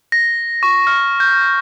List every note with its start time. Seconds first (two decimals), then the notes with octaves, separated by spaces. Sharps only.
0.12 A#6
0.63 C#6
0.87 F6
1.20 G6